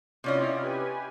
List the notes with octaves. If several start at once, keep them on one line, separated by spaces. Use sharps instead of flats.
C3 C#4 E4 F4 D5 D#5
G4 B4 G#5